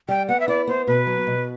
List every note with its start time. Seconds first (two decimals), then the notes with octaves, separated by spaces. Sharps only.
0.08 G3 G5
0.28 B3 F#5
0.40 E5
0.48 E4 D5
0.67 B3 C5
0.87 B2 B4
1.07 F#3
1.27 B2